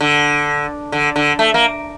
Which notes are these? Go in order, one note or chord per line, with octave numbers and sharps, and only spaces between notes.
D3
D3
D3
A3
A#3